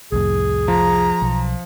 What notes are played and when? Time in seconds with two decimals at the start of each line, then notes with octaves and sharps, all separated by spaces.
0.12 C2 F2 A2 G#4
0.68 F3 A#5
1.22 B1